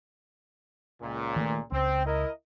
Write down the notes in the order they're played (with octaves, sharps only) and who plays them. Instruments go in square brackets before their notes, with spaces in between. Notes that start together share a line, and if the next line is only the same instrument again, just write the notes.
[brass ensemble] C#2 A#2
[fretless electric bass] D#3 F3 A3
[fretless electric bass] C#2 [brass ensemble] C4
[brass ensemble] E4 A#4 D#5